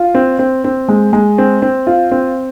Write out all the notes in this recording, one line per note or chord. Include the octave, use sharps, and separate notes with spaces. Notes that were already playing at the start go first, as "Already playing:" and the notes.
Already playing: F4
C4
C4
C4
G#3
G#3
C4
C4
F4
C4